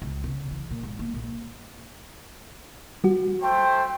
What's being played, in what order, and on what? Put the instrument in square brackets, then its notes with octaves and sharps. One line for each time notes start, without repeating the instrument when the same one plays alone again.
[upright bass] C#2
C#3
E3
A#2
G#2
A#3
A#1
[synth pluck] G3 F#4
[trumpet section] A3 C5 [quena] G5